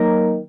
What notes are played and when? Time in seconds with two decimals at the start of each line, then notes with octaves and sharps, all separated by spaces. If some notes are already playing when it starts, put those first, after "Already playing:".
Already playing: D#3 F#3 A#3 D#4 A#4